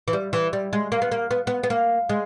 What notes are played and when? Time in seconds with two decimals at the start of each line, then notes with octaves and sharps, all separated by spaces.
0.08 E3
0.13 G3
0.33 E3
0.53 G3
0.73 G#3
0.92 A#3
1.02 B3
1.12 A#3
1.31 B3
1.47 B3
1.63 B3
1.70 A#3
2.10 G#3